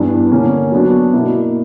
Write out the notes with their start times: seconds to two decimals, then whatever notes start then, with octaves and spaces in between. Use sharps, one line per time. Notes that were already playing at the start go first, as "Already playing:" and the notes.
Already playing: G2 E3 B3 D4
0.32 D3 A#3 C#4
0.72 F#3 B3 D4 F#4
1.13 B2 A#3 E4